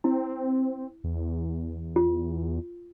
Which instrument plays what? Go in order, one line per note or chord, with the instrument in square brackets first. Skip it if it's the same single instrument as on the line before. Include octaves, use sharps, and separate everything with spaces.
[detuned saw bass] C4 [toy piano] E4
[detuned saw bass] E2
[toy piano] F4